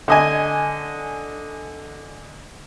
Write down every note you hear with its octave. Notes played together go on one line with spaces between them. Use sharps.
D3 D#5 G#5